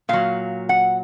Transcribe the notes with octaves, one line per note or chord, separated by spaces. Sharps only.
A#2 F#3 F5
F#5